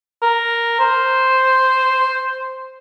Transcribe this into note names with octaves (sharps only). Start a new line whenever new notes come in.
A#4
C5